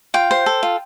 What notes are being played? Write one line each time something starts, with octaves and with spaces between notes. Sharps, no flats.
F4 G5
C5
A4
F4